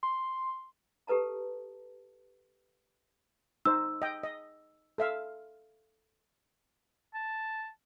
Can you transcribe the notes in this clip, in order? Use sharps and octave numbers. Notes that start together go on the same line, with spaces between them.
C6
G4 A4 B4 A5 A#5
D#4 C5 E6
D#5 G5
D#5
A4 E5 F5
A5